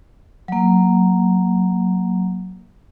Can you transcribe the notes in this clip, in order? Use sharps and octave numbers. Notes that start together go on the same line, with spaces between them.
F#3 A#3